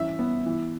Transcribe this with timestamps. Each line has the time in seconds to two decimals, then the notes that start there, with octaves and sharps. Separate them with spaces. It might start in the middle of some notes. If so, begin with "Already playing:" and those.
Already playing: E3 C#4 E5
0.19 B3
0.46 E3